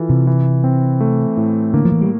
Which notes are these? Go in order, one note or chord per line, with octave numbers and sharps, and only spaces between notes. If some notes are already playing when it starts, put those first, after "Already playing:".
Already playing: E3 F4 A4
C3
E3
C4
A3
A2
D3 A#3
F3
E3
G3